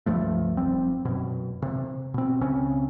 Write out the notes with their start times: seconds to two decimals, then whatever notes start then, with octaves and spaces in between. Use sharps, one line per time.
0.06 C#2 G2 F3 A3
0.57 F1 F3 G3 C4
1.05 F#2 B2
1.62 C3
2.14 B2 C4
2.41 C#2 C#3 C4 C#4